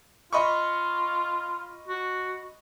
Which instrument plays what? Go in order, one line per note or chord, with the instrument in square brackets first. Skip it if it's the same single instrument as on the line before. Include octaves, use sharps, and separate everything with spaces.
[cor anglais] F4 [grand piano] D#5 B5 C#6
[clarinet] F#4